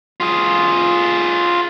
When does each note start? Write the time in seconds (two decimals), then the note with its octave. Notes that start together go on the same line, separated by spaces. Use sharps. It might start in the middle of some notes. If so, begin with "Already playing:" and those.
0.20 F4 G#4